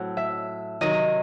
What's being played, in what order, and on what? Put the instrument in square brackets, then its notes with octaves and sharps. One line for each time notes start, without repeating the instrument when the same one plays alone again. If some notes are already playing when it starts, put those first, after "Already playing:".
Already playing: [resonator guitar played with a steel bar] A2 F#3 C4
[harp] E5
[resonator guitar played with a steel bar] C3 D#3 F#3 [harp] D#5